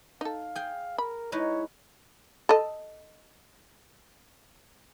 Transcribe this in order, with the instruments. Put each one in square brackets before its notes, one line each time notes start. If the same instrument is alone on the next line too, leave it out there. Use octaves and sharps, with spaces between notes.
[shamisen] D#4 A4 [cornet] F5
[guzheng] G#4 G5
[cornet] A#4 [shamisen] B5
[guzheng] G#3 D#4 B4 [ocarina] E4 [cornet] C#5
[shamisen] A4 D#5